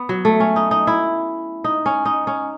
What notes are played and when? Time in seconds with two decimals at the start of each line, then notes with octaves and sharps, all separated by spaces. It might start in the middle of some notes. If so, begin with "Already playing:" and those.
Already playing: B3
0.09 F#3
0.25 A3
0.40 C#4
0.56 D#4
0.71 D#4
0.87 E4
1.64 D#4
1.86 C#4
2.05 D#4
2.27 C#4